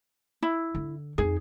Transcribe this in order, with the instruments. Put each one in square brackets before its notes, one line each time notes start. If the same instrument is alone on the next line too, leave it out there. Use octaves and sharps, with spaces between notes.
[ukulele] E4
[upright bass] D3
[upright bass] F2 D#4 [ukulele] G#4